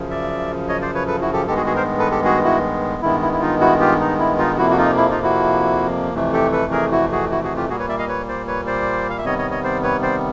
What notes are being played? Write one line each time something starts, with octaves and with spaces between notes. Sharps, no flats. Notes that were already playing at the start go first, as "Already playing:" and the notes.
Already playing: F#2 C#3 F3
D5 E5
C#5 D#5
C5 D5
B4 C#5
A4 B4
E4 F#4
G4 A4
G2 D#3 G#3 B3 G4 A4
F#4 G#4
F#4 G#4
A#4 C5
A4 B4
G4 A4
F#4 G#4
E4 F#4
G2 D#3 G#3 B3 E4
E4
E4
D#4 F4
E4 F#4
F4 G4
D#4
E4
D#4 F4
F2 C3 F3 A#3 E4 F#4
F#4
D#4 F4
E4
D#4 F4
E4 F#4
F2 C3 E3 A3
G4 A4
A4 B4
G#4 A#4
E4 F#4
F#4 G#4
E4 F#4
F#4 G#4
F4 G4
A#2 G3 A#3 F#4 G#4
B4 C#5
D5 E5
D#5 F5
B4 C#5
C5 D5
B4 C#5
C5 D5
F5
E5
C3 D#3 G3 B3 C#5 D#5
C#5 D#5
C#5 D#5
C5 D5
B4 C#5
C5 D5